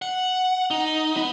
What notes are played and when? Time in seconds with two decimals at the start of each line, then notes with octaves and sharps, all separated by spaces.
0.02 F#5
0.71 D#4
1.16 B3